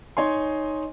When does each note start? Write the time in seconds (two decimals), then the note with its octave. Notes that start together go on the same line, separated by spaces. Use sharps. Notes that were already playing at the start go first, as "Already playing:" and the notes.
0.17 D#4 C#5 G#5 C6